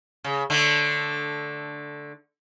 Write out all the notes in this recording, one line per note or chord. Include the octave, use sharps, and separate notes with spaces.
C#3
D3 A3